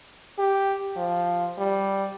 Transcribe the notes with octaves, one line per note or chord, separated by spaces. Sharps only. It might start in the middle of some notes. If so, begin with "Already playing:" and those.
G4
F3
G3